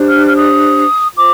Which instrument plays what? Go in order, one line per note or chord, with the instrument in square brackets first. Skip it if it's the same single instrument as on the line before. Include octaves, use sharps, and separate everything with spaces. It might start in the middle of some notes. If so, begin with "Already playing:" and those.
Already playing: [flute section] D4 G4 C5
F6
F6
D#6
F4 C5 D6